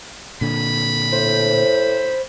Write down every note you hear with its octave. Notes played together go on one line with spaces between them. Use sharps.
A#2 D3 B5
A2 C5